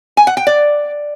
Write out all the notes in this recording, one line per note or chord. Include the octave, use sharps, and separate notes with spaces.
G#5
F#5
G5
D5